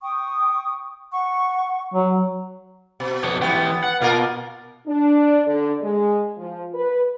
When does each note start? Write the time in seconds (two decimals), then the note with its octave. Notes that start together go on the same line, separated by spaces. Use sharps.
0.02 G5 C#6 D#6
1.12 F#5 C#6
1.94 F#3
3.00 B2
3.24 F2 B3 C#5
3.42 E3 B3 G4
3.84 F#5
4.02 B2 A#3 F4 A#4
4.86 D4
5.46 D3
5.81 G#3
6.37 F3
6.74 B4